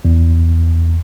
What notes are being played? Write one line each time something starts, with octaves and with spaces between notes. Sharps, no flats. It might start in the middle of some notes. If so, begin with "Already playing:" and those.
E2